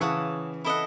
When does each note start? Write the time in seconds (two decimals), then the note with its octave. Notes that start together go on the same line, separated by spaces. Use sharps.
0.01 C#3 E3 C#5 F#5 A5 D#6
0.64 E4 A4 D#5 F#5